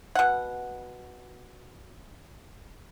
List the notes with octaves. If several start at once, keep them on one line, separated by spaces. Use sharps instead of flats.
B2 F#5